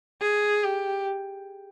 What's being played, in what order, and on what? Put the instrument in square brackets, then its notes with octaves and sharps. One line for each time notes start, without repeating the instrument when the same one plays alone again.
[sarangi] G#4
G4